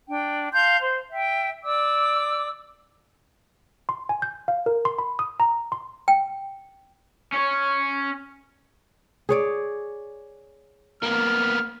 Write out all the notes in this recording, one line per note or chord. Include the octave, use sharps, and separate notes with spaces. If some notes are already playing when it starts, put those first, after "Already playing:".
D4 G5
F5 A5 C6 G6
C5
E5 G5
D5 D6 E6
C6
G#5
G6
F5
A#4
C6
B5
D#6
A#5
C6
G5
C#4 C#5
G#4 C#5 D5
A#3 B3 F6